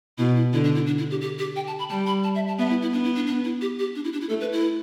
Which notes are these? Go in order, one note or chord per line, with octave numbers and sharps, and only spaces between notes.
B2 E4
E4
D3 E4
D4
E4
D4
E4
G4
G4
G4
G5
A5
B5
G3 A5
B5
A5
E5
A5
B3 E5
E4
E4
B3 D4
E4
D4
D4
E4
G4
G4
D4
E4
D4
E4
A3 A4
B4
E4